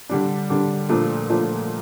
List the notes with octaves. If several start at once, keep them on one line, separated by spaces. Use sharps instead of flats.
D3 G3 D4
D3 G3 D4
A#2 F3 A3 D4
A#2 F3 A3 D4